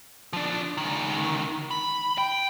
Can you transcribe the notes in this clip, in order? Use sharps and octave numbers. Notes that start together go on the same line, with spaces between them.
F3 D4
C#2 D#3
B5
G5